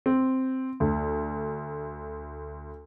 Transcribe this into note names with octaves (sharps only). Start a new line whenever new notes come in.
C4
D2